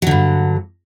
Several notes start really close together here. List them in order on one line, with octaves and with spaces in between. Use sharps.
F#3 D3 G2